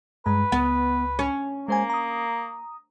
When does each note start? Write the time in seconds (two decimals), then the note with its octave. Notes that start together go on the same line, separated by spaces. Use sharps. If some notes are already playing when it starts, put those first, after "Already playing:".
0.26 G2 G#3 B4 A#5
0.52 C#2 B3
1.19 C#4
1.68 G#3 A#3 C5 G#5
1.90 A#5 D#6